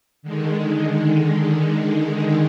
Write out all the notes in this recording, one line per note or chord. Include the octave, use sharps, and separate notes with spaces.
D3 D#3 G#3